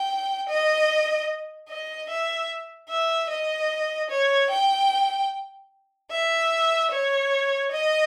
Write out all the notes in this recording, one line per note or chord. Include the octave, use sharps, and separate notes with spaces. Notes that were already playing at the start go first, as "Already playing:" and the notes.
Already playing: G5
D#5
D#5
E5
E5
D#5
C#5
G5
E5
C#5
D#5